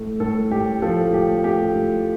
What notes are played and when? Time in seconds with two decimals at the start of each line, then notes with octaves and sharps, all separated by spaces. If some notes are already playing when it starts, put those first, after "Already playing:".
Already playing: A2 A3
0.20 A2 A4
0.51 A2 G4
0.82 F3 A4
1.13 A2 G4
1.44 A3 G4
1.75 A2